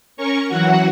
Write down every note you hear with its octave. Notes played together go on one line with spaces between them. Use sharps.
C#4 A#4 C#6
E3 F#3 F#4 F#5